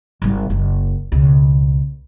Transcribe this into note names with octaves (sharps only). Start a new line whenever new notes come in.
G#1 G3
F#1
C#2 B2